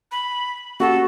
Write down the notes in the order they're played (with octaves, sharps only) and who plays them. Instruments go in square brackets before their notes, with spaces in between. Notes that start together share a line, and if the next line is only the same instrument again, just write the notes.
[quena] B5
[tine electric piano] A#3 C#4 G4 [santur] F#4 [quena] A4